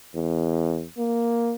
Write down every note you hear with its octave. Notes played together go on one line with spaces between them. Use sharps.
E2
A#3